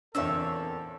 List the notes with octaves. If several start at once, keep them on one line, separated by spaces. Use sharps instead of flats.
E2 A#2 D3 C4 A4 C#5 E6